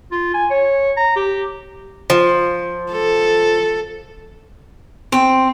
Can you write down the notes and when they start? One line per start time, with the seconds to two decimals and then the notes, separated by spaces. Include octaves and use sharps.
0.12 F4
0.34 G#5
0.50 C#5
0.97 A#5
1.16 G4
2.10 F3
2.92 A4
5.12 C4